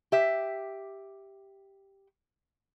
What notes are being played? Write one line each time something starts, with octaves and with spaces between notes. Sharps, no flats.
G4 E5